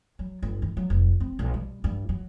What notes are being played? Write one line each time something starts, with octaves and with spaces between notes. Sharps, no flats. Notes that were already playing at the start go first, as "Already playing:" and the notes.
F#3
G1
D#3
F#3
F1
C4
B1
G3
G2
F#3